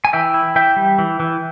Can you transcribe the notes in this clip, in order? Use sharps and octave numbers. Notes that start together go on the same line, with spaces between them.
G#5
E3 E5 G5
E4
E3 E5 G5
G3
E3
E3